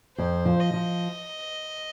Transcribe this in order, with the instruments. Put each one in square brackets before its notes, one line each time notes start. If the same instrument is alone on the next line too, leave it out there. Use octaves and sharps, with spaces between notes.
[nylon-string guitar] F2 [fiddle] C5
[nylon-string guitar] F3
[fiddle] D#5
[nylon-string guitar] F3